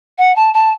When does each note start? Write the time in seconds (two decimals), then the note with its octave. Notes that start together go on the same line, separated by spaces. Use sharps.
0.18 F#5
0.35 A5
0.53 A5